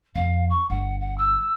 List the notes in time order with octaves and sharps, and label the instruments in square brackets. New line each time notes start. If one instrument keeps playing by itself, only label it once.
[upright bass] F2 [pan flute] F5
[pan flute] C#6
[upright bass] G1 G3 [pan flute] F#5
[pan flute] F#5
E6